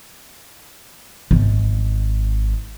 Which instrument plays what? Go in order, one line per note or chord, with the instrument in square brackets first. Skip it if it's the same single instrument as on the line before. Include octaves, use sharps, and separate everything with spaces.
[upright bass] G#1